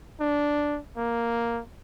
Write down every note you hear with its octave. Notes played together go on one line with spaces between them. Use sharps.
D4
A#3